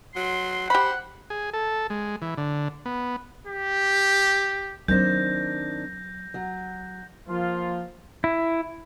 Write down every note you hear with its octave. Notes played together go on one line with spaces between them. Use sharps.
F#3 C6
G4 C5 F#5 B5
G#4
A4
G#3
E3
D3
B3
G4
D#3 F#3 A#3 C4 D4 G6 A#6
F#3
F3 A#3 F4
E4